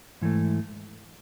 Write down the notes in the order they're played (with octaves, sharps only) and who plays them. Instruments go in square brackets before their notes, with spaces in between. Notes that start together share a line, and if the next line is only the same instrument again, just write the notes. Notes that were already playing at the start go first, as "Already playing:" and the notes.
[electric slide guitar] G#2 E3 A3